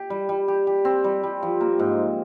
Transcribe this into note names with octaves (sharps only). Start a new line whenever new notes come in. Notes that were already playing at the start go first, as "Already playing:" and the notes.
Already playing: G4
G3
G3
G4
G4
C4
G3
G3
F3
A#3
G#2